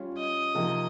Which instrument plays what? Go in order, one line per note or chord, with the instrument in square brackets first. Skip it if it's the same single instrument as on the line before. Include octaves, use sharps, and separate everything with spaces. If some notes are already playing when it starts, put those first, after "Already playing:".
Already playing: [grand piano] G3 C#4 F4
[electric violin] D#5
[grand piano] C3 F3 A#3 D#4